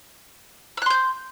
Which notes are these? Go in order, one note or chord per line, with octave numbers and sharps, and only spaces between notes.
C6 E6 F#6 G6